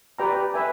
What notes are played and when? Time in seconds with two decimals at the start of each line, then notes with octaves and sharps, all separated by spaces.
0.18 G4 B4 D5 G5 A#5
0.54 B4 E5 G#5